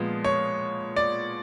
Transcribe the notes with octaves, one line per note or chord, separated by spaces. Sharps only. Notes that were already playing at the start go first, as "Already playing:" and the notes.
Already playing: A#2 F3 G#3 B3
C#5
D5